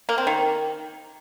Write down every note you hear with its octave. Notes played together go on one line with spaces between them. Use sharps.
A#3
C4
D#3